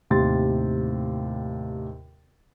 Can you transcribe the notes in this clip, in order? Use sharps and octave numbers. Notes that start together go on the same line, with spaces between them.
D#2 A2 C3 C6 A6